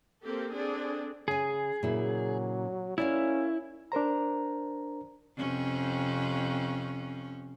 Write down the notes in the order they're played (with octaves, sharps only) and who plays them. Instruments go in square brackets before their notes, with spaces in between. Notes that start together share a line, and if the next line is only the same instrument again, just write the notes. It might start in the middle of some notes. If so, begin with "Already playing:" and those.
[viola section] A#3 C4 G4 A4
C4 D4 G#4 A4
[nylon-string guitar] C#3 G#5 [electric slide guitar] G#4
[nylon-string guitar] A#2 C#3 E4 [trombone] F#3
[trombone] C#4 [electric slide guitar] E4 [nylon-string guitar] A#4 D5 F5
[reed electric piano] D4 A#4 C5 A#5
[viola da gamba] F2 C3 C#4